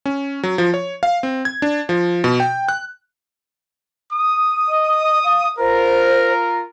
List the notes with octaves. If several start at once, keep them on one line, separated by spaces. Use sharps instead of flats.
C#4
F#3
F3
C#5
F5
C4
G#6
D4
F3
B2
G5
F#6
D#6
D#5
F5
F4 A#4 C5